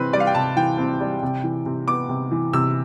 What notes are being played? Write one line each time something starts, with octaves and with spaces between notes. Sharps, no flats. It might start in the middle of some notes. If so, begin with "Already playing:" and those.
Already playing: C3 E3 C4 B4
G3 D5
F5
G5
C3 A5
E3 G5
C4
G3
C3
E3
C3
B3 D6
C3
E3
C3 E6